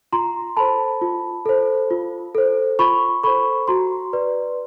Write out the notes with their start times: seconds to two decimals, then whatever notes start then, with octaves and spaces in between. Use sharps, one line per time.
0.13 F4 A#5 C6
0.57 A4 C5 A5 B5
1.01 F4
1.46 A4 C5
1.91 F4
2.35 A4 C5
2.79 F4 B5 C#6
3.23 A4 C5 B5 C#6
3.68 F#4 A#5 C6
4.13 B4 D5